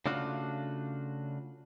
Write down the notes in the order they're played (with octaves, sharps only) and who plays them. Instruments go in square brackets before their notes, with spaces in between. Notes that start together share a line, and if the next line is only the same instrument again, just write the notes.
[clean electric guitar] C#3 A3 D4 F4 F#4